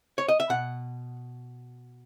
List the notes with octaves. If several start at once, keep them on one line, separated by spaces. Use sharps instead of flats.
C#5
D#5
E5
B2 F#5